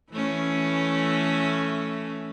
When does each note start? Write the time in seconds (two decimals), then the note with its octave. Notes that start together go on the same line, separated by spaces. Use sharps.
0.11 E3 A3 C#4